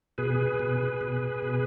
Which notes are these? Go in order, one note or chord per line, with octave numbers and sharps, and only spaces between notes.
B2 G#4 B4
B2
B2
B2